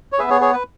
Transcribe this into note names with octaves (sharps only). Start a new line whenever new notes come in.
C#5
B3 G#4 B4 E5
G#4 C#5
G#4 C#5
B4